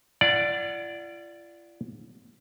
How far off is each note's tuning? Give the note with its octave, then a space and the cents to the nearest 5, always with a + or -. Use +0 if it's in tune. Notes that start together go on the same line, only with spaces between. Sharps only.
F4 -45 D5 +0 F#5 +0